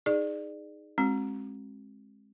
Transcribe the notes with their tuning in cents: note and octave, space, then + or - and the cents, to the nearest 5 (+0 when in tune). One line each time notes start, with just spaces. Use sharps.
D#4 +0 G#4 +0 D5 +25
G#3 +0 C4 +35 F#4 +0